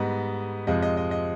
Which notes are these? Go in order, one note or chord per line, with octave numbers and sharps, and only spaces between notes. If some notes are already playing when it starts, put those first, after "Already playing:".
Already playing: G#2 G3 B3 D#5
F2 C3 F3 G#3 C4 D#5
D#5
D#5
D#5